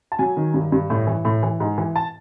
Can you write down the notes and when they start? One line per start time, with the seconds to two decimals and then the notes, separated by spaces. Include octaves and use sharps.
0.12 A5
0.19 F#3 G#5
0.37 D#3
0.54 G2
0.72 G2
0.90 A2
1.07 E3
1.25 A2
1.43 E3
1.60 G#2
1.78 E3
1.96 A5